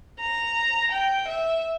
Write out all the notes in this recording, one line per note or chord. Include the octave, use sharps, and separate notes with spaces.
A#5
G5
E5